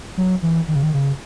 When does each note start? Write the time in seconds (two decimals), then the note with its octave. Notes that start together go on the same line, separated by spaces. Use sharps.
0.17 F#3
0.43 E3
0.68 D#3
0.75 C#3
0.83 D#3
0.94 C#3